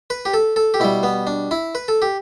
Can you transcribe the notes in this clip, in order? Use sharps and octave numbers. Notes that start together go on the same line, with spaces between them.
B4
G4
A4
A4
G4
B2 G3 E4
B3
D4
E4
B4
A4
G4